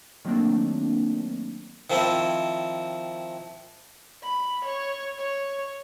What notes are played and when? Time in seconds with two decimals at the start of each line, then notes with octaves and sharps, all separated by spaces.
0.25 D#3 F#3 A3 A#3 C4 D4
1.90 D#3 F3 C4 E4
4.23 B5
4.65 C#5
5.17 C#5